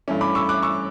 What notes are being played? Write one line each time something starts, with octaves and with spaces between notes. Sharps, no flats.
G2 E3 A3 C#4
B5 D6
C#6 E6
D6 F#6
C#6 E6